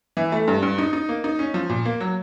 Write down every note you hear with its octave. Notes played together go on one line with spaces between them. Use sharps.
E3
A3
G2
G2
D#4
D#4
A#3
D#4
C#4
F3
A#2
A#3
F#3